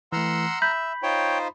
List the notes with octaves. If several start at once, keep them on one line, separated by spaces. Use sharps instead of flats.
E3 A3 F#5 A#5 C6 E6 F6
E5 B5 G6
D#4 F4 C5 C#5 G5